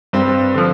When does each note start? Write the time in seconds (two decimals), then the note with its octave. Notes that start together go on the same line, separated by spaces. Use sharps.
0.13 G2 C4
0.54 D3 F3